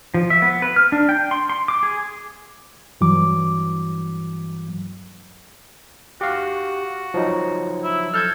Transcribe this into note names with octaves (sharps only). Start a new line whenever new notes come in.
F3
E5
B3
B4
F6
D4
G5
C6
C6
D6
G#4
G2 E3 F#3 D6
F#4 G4 F5
F3 F#3 D#4
E4
A4 F6 G6 G#6